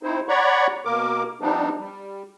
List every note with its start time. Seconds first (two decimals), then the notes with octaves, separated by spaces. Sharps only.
0.03 C4 D#4 E4 C5
0.29 C#5 D5 F#5 A#5 B5 C#6
0.85 B2 A#3 A#4 D6
1.41 F3 G3 B3 C4 D4 D#4
1.79 G3